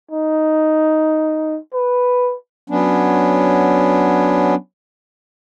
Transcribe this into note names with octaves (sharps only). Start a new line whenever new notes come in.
D#4
B4
F#3 B3 C#4 D4